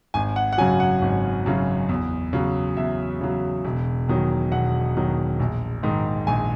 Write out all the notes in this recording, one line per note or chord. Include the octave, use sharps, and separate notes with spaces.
G#1 G#5
F#5
F#5
F#2 C#3 F#3 G#5
F#5
G#1
F#2 C#3 F#3
E2
C#3 F#3
E2 E5
C#3 F#3
E1
E2 D#3 F#3
E1 F#5
E2 D#3 F#3
A#1
G#2 D#3
A#1 G#5